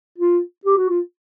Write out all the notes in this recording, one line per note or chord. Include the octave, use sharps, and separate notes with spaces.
F4
G4
F#4
F4